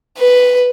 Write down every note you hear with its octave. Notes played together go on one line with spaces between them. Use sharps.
B4